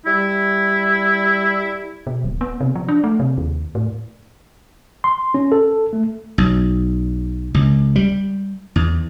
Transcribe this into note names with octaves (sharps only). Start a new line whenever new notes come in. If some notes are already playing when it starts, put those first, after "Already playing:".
G3 E4
B2
D1
B3
C3
F3
D4
A3
C3
D#2
A2
C6
C#4
A4
A3
B1
C#2
G3
E2